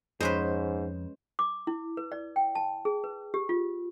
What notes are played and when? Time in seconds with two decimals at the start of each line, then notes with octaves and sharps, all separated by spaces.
0.21 F2 G#2 G#3 C#4 B4 C5
1.39 D6
1.67 E4
1.97 B4
2.12 D5
2.36 G5
2.55 A5
2.85 G#4
3.04 B4
3.34 G4
3.49 F4